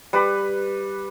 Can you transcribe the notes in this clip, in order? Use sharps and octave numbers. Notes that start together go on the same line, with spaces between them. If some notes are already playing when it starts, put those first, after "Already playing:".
G3 B4